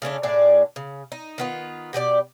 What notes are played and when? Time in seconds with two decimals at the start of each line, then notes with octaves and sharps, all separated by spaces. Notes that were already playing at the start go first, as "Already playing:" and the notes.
0.02 C#3 A3 C#4 D4
0.23 A2 D4 G#4 D5
0.76 C#3
1.12 D#4
1.38 D#3 B3 F4
1.93 B2 G4 G#4 D5